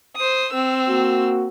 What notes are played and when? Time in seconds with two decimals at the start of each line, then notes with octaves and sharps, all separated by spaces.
0.18 C5 D#6
0.52 C4 E6
0.87 A#3 F#4